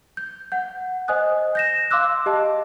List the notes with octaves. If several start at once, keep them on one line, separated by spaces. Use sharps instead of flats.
G6
F#5 G6
C5 D#5 G#5 D#6 F#6
G6 A#6 E7
F5 C6 D6 E6 F#6
G4 D#5 A5